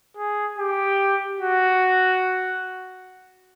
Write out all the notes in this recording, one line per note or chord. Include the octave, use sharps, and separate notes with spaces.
G#4
G4
F#4